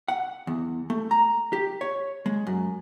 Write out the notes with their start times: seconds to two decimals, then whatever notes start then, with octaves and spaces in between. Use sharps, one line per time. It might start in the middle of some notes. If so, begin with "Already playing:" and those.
0.08 F#5
0.47 E2
0.90 A3
1.11 A#5
1.53 G4
1.81 C#5
2.26 G#3
2.47 F#2